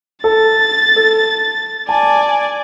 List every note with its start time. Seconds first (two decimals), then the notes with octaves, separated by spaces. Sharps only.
0.24 A4 A5 A6
0.96 A4
1.89 D5 G#5 A5